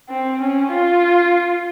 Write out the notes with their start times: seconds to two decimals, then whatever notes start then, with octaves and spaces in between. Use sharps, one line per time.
0.09 C4
0.41 C#4
0.72 F4